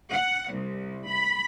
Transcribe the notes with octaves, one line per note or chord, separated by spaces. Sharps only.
F#5
C2
B5